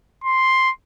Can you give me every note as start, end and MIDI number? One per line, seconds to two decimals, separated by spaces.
0.24 0.71 84